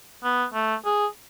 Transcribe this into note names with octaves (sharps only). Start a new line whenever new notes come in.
B3
A3
G#4